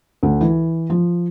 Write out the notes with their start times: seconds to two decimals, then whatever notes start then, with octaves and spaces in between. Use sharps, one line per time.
0.23 D2
0.41 E3
0.90 F3